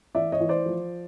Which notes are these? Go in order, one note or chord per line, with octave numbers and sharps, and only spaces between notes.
E3 D5 E5
C#5 D#5
E3
C5 D5
F3